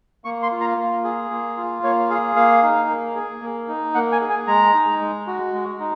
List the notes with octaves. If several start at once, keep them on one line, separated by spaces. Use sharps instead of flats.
A#3 C#6
C6
F4
A#5
A#3
G#4
A#3
F4
A#3 C#5
G#4 F5
A#3 F5
D#4
A#3
G#4
A#3
D#4
A#3 F#5
G#5
G#4
G#5
G#3 A#5
D#4
G#3
F#4
G#3
D#4